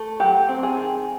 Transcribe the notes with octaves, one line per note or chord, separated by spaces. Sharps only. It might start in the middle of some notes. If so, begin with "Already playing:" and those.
Already playing: A3
F#3 G4
C4
G#4
D#3